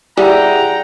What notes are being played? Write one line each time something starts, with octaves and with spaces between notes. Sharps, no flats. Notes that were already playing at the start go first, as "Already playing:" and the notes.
G3 E4 G#4 E5 F#5 G5 A#5